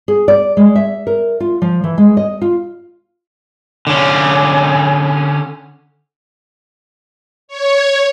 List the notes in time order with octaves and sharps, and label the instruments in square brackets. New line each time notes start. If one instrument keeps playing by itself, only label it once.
[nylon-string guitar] G#4
D5
G#3
E5
A#4
F4
F3
E3
G#3
D#5
F4
[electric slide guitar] D3 C#4
[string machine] C#5